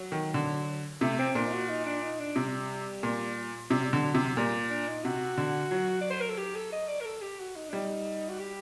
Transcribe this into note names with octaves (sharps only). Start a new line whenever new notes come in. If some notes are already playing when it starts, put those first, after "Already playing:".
Already playing: F#3
D#3
D3
C3 A3
C4
A#2 D4
D#4
F#4
D#4
D4
D#4
D4
C3 G3
A#2
C3 G3
F#3
G3
D3
F#3
C3
A#2 G3
D4
D#4
C3 F#4
D3
F#3
D5
C5
A#4
A4
G4
A4
D#5
D5
A#4
A4
G4
F#4
D#4
D4
G3 D#4
F#4
G4